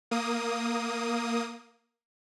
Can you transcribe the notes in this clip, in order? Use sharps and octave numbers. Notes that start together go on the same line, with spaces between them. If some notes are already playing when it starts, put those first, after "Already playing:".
A#3 D#6